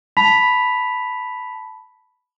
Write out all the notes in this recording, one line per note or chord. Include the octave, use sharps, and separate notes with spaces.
A5 B5 B6 F7